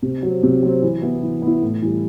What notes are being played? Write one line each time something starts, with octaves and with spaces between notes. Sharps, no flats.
C3
F#3 C4
C3
F#3 C4
E3
B3 E4
E3
B3
E4
A2
E3 G3